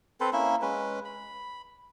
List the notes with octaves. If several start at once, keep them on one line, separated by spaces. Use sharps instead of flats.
C4 A4 B4 C5
A#3 C#4 E4 E5
G#3 C#4 B4
B5